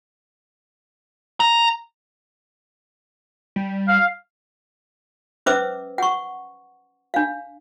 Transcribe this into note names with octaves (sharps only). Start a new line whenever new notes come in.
A#5
G3
F5
C#4 B4 C5 E5 D6 E6
F#5 C#6
D4 F5